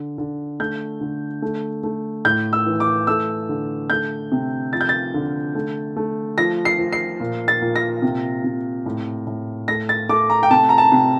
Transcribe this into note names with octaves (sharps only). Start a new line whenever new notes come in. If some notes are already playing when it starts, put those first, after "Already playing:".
Already playing: D3
D3
A3 G6
D3
A3
A3
A2 G6
E6
E3
D6
A3 E6
D3
A3 G6
C3
F3 A6
G6
A6
D3
A3
A3
F3 A#6
C7
F3
C7
A#2
A6
A#2
A#6
C3
C3
A2
A2
A3 A#6
A6
A3 D6
A#5
G5
C3 A5
A#5
A5
C3